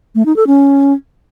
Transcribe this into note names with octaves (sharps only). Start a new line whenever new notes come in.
A3
D#4
A4
C#4